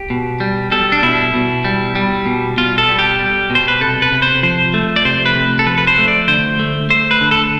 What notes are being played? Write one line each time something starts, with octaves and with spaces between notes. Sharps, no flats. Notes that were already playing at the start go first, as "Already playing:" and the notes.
Already playing: G4
B2
G3
G3 A4
D4
B2 E4
B2
G3
G3
B2
B2 F4
A4
G3
G4
G3
B2
C5
B4
C3 A4
B4
C3
C5
F3 C5
A3
D5
C3 C5
B4
C3
A4
F3 B4
B4
C5
A3
D5
D3 C5
A3
A3 C5
B4
D3
A4